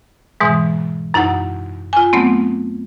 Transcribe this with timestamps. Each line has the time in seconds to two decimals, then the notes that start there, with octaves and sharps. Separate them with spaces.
0.40 G#2 B2 E3 G#3
1.14 F#2 D#4 E4 F#5 A#5
1.93 F4 G#5
2.13 F#3 A3 B3 C4